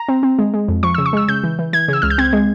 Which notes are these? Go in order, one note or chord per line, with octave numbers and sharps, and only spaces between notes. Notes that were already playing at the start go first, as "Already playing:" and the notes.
Already playing: A#5
C4
C4
G#3
G#3
F2
F3 C#6
C#3 E6
C#6
G#3 E6
C#3 G6
E3
E3
E3 G#6
C#3 E6
C#2 F6
G6
C4 G#6
G#3